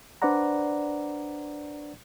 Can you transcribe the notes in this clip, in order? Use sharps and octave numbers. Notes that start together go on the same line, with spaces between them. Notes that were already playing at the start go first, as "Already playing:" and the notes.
D4 B4 C5 D5 F#5 A#5